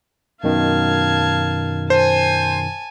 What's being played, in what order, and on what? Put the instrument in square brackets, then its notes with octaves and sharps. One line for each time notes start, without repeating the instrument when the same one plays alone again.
[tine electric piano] F#2 B2 D#3 [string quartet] F5 A5 G#6
[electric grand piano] C5 [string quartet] G#5 A5